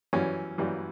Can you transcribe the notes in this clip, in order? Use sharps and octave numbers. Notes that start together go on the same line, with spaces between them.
F#2 E3 G3 C#4
F#2 E3 G3